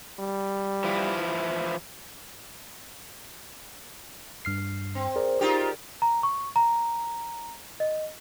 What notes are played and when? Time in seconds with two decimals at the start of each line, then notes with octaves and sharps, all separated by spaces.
0.19 G3
0.84 E3 F3 E4
4.45 G2 F6 C7
4.95 C4
5.16 G#4 A#4 D5
5.41 D#4 F4 G4
6.02 A#5
6.23 C#6
6.56 A#5
7.80 D#5